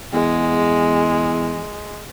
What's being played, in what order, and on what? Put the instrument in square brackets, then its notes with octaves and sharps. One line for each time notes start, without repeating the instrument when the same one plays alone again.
[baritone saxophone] E2 [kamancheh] G#3